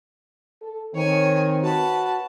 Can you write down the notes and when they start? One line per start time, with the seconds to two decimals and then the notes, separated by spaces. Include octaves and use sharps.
0.62 A4
0.95 D#3 C4 C#5 G#5
1.63 F#4 B4 A5